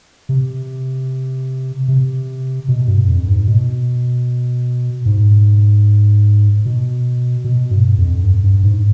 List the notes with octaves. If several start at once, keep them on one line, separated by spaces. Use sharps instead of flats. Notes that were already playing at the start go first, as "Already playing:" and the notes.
C3
C3
B2
G2
F2
G#2
B2
G#2
B2
B2
G2
F2
G2
G2
G#2